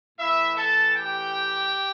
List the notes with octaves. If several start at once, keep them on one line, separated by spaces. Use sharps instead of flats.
A2 E3 E4 E5
A4 A5
G4 G5